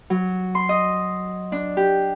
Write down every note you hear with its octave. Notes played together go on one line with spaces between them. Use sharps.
F#3
C6
D#5
D4
G4